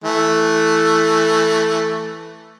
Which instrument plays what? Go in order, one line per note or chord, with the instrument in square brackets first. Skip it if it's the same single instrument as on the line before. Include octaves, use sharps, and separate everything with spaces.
[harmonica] E3 A3